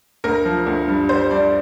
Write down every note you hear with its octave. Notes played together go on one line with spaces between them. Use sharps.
D2 A#4
F3
D2
G2
G3 C5
G2 D5